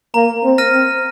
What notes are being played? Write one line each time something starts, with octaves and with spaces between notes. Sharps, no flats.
A#3 A#5
C4
F6 A#6 D#7
C4